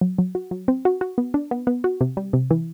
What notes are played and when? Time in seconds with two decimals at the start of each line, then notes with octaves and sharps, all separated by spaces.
0.01 F#3
0.18 F#3
0.35 F#4
0.51 F#3
0.68 C4
0.85 F#4
1.01 F#4
1.18 B3
1.34 D4
1.51 B3
1.67 B3
1.84 F#4
2.01 C3
2.17 G3
2.33 C3
2.51 E3